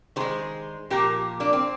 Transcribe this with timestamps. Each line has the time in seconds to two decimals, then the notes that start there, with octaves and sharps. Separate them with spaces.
0.16 D#3 G#3 G#4 C5
0.90 A#2 F3 A#3 G4 A#4
1.40 A#3 D4
1.53 C4